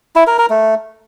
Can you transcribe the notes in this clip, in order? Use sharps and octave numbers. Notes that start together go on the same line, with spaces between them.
E4
A#4
A#4
A3